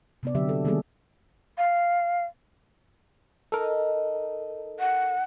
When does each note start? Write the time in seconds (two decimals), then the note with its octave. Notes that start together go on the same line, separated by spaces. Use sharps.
0.23 C3 B3 D5
0.35 D3 F#3 G4 E5
0.49 A4
0.65 D#3 G3 A#3 B3 G#4 A4
1.58 F5
3.52 D#4 A4 A#4
4.80 F#5